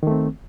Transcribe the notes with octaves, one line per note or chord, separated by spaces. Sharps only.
D#3 A3 C4